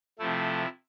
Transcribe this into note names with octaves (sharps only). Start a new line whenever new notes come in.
C3 F3 A3 E4